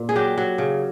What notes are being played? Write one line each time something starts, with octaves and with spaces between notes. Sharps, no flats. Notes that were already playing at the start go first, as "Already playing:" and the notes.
Already playing: A#2
G#4
F#3 G4
F#3
C#3